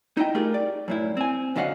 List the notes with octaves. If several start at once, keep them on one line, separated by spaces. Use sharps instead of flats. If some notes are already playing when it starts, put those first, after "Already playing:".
D#4 E4 D#5 G5
A3 F4 G4 G#4 A#4
D5
F#2 A2 E4
C4 G#5
F#2 D3 F#3 D#5 F5 F#5